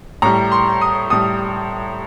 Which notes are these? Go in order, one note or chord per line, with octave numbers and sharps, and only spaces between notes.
A2 G3 A#5
C6
D#6
A2 G3 D#6